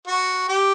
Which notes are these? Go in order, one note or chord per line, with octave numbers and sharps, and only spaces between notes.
F#4
G4